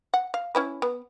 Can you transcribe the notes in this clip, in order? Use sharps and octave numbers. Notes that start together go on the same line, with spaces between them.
F#5
F5
C#4 E4 B4
B3